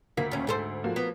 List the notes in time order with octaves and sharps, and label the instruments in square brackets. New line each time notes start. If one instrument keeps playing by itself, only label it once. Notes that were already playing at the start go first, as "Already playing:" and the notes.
[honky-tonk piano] D2 B6 [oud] A#3
[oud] D#2 C#4
G#2 A4 C5
[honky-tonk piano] F3 A#3 F#4
[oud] B3